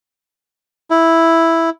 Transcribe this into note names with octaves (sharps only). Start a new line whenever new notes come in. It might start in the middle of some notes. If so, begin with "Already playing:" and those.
E4